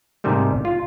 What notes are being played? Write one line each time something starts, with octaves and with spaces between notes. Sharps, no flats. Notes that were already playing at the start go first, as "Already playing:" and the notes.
G#2 C3 D#3 G3 A3
F4